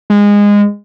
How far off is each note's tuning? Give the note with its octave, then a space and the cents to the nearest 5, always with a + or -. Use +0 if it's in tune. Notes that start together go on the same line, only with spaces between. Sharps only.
G#3 -20